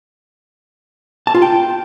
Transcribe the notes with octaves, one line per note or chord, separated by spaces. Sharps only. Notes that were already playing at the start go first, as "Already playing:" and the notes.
A5
F4
G5